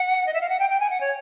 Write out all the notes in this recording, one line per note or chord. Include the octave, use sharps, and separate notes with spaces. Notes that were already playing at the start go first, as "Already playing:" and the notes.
Already playing: F#5
D#5
E5
F5
F#5
G5
G5
G#5
F#5
C#5